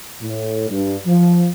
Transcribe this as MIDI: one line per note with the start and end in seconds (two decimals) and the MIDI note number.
0.22 0.67 45
0.70 0.97 43
1.06 1.50 53